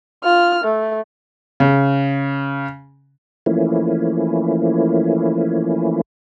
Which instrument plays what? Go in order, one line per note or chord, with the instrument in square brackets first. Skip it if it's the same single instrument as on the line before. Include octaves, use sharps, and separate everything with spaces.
[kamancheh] F4 F6
A3
[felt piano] C#3
[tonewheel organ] E3 F3 A3 A#3 C#4 E4